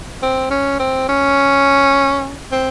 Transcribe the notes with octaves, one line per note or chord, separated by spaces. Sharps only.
C4
C#4
C4
C#4
C4